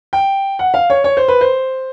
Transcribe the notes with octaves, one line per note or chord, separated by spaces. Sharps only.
G5
F#5
F5
C#5
C#5
C5
B4
C5